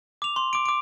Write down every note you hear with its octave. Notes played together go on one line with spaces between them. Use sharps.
D6 F7
C6
D6 D7
D6 D7